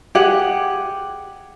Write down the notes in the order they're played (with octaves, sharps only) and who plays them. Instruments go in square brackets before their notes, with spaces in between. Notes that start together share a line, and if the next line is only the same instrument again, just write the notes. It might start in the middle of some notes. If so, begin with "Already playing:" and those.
[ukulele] G4 G#4 F#5